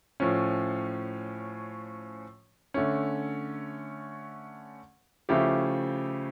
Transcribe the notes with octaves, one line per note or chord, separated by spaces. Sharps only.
A2 F3 C#4
D3 A3 C#4
C#3 F3 A3 E4 G4